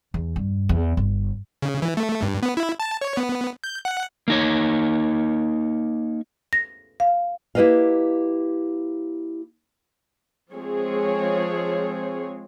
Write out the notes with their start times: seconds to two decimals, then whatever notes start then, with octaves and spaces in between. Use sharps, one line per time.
0.14 E2
0.36 G2
0.69 E2
0.97 G1
1.62 C#3
1.82 E3
1.97 A3
2.22 G2
2.43 B3
2.57 E4
2.80 A5
3.01 C#5
3.17 B3
3.64 G6
3.85 F#5
4.28 A#3 D#4 C#5
6.53 A#6
7.00 F5
7.55 A#3 E4 G4 B4 D#5 F5
10.54 F3 G#3 C4 G#4 C#5